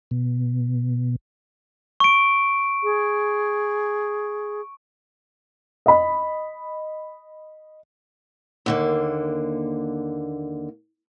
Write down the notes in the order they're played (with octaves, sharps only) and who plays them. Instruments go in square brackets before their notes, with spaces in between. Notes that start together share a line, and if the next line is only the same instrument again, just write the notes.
[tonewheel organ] B2
[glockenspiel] C#6 D7
[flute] G#4
[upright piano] D#5 B5
[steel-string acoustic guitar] D#2 D3 A#3